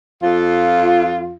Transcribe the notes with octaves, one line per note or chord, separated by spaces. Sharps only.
F2 F4